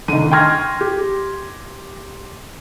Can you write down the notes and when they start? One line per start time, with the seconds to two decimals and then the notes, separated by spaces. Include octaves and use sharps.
0.08 D3 D#3 D#7
0.31 G5 C6 C#6 F6 G#6 A#6
0.81 G4